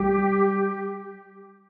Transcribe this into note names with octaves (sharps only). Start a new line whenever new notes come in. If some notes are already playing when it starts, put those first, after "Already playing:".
Already playing: G3 G4